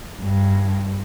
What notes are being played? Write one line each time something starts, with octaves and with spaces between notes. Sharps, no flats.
G2